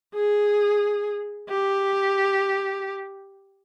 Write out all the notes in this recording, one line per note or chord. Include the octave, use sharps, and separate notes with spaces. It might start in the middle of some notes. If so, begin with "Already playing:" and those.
G#4
G4